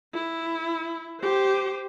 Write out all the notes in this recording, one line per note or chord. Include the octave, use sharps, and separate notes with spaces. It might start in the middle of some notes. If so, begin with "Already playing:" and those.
E4
G4 C5